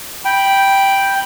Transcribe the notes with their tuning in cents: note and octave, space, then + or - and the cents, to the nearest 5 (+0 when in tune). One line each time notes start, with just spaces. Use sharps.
G5 +0 B5 -10